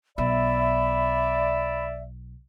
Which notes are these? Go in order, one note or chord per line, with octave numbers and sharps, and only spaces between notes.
B1 B3 D5 E5 B5